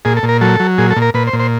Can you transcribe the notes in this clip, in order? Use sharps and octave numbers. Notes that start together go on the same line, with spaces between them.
A#2 G#4
A4
A#2
A#4
F#3 A4
F#3
A#2 G#4
A4
A#2
A#4
A#2 B4
C5
A#2
C5